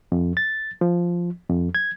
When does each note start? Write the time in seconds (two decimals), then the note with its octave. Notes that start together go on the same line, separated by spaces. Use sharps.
0.12 F2
0.37 A6
0.81 F3
1.50 F2
1.75 G#6